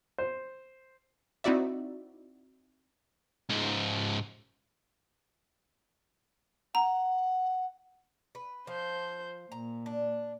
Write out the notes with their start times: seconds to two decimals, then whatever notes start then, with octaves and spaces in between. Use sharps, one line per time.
0.18 C5
1.44 C4 D#4 E4 F#4 D5 E5
3.49 C#2 G#2
6.75 F#5 A#5
8.35 B4
8.67 F3 C5 G6
9.52 A#2 A#5
9.86 D4